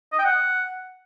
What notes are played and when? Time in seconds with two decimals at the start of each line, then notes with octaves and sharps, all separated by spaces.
0.13 D#5
0.19 G5
0.24 F#5